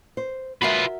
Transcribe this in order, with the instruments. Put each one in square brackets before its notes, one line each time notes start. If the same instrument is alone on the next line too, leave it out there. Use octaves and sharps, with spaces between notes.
[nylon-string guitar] C5
[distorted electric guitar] F4 B4 [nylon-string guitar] F#4 A#4 E5